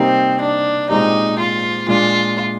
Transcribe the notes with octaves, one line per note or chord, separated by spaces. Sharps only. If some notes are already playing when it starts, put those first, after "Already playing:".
Already playing: C3 G3 A#3 C4 D#4
D4
A#2 G#3 C4 D#4 G4
F4
A#2 G#3 D4 F4